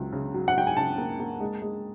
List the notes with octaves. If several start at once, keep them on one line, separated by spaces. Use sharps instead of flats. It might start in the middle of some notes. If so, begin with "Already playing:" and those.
Already playing: C#2 F#3
C#3
F#3
F#5
F#3 G5
G#5
C#3 A5
A#3
A#3
G#3
G#3